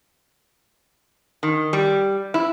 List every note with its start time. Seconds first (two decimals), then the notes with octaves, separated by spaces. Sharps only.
1.43 D#3
1.73 G3
2.34 E4